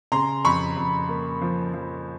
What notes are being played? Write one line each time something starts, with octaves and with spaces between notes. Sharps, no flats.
C#3 A#5 C6
F2 B5 C#6
F2
A#3
F3
F3